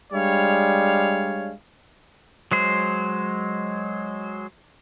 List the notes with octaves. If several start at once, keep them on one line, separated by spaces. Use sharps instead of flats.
G3 G#3 D4 C#5 F5
F#3 G#3 C5